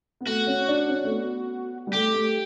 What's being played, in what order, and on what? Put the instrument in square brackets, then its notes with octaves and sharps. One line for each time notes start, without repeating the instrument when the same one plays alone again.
[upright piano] B3
[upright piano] A3 [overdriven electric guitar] F#4
[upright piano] C#4
D4
C#4
A3
B3
G3
[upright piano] A3 [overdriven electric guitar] G4
[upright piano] A3